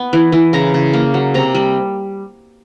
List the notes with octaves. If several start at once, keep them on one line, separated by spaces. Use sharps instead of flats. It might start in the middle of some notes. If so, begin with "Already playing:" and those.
Already playing: B3
E3
E3
C#3 A#5
C#3
A#3
F#3
C3 A#5
G3